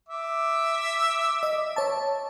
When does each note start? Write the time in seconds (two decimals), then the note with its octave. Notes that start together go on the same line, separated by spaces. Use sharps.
0.09 E5 D6
1.43 D#5
1.76 C#5 A5